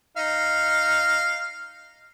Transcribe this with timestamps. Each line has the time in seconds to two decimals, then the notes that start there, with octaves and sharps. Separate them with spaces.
0.17 D#4 F5